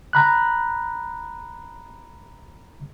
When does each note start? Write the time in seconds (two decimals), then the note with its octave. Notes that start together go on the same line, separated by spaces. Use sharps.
0.13 A#5 B5 F#6